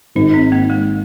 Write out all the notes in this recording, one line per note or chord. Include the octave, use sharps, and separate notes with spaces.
G#1 G#2 D#3 D#4
C4
A#3
G#3